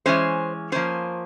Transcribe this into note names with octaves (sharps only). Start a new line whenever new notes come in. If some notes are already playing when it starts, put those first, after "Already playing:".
E3 G#3 C#4 C5
F3 A#3 C#4 C5